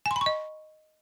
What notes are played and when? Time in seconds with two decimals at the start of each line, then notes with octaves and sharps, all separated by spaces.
0.06 G#5
0.11 C6
0.16 B5
0.21 C#6
0.26 D#5